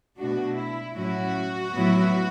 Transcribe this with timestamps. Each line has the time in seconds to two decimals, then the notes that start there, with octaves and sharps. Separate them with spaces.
0.18 B2 A3 D4 F#4
0.57 E4
0.96 A2 F#3 C#4 E4 F#4
1.74 A2 F#3 B3 E4